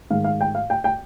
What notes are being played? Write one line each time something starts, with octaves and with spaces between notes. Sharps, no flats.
G#2 D#3 G#3 F5
F5
G5
F5
G5
G5